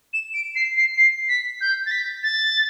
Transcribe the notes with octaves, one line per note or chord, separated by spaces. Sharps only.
E7
D7
C7
C7
C7
B6
G6
A6
B6
A6